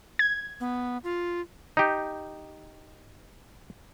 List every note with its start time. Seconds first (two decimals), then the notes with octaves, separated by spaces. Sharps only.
0.19 G#6
0.60 B3
1.04 F4
1.77 D#4 G4